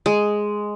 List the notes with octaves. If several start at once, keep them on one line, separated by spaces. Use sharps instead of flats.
G#3